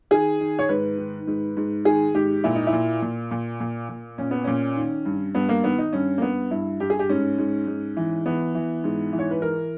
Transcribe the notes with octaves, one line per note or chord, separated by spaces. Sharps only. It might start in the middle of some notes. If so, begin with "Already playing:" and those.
D#3 G#4
D#3
C#5
G#2 B4
D#3
G#2
G#2
D#3 G#4
G#2 G4
A#2 E4
D#4
E4
A#2
A#2
A#2
A#2
A#2
A#2 C#4
B3
A#2 C#4
D#3
G2
G2 B3
A#3
D#3 B3
D#4
G2 C#4
A#3
G2 B3
G2 E4
G2 G4
G#4
G4
G#2 C#4
G#2
G#2
E3
E3 B3
E3
G#2
E3
C#5
B4
E3 A#4